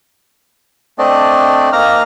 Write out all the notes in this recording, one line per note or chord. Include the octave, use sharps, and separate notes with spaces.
A3 C4 D4 D5 D#5
A#3 D#4 F5 A#5 F6